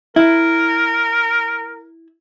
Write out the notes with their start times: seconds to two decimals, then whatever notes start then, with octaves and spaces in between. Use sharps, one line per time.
0.16 E4 A#4